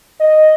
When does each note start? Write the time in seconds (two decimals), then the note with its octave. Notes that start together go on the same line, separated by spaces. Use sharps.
0.20 D#5